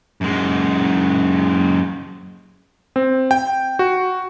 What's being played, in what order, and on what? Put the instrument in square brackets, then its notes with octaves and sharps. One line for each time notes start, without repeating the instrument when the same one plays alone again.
[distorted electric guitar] F#2 G#3
[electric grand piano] C4
G5
F#4